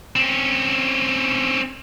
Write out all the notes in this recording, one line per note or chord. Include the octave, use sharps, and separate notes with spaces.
C4 C#4